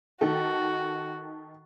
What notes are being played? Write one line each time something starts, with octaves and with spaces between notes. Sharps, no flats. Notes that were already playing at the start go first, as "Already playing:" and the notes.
D#3 F#4 A4